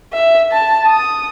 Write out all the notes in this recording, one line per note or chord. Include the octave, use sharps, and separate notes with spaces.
E5
A5
D#6